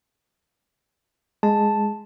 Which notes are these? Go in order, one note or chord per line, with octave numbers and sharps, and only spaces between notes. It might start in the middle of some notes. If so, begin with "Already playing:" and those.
G#3 A5